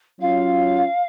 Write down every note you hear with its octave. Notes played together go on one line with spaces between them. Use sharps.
F#3 C#4 F4 F5